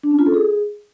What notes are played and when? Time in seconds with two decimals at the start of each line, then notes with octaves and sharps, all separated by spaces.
0.03 D4
0.11 C#4
0.19 F4
0.26 A4
0.34 G#4